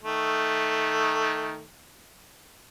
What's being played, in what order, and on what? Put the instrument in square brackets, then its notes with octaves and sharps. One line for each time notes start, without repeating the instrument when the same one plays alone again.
[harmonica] D#3 A3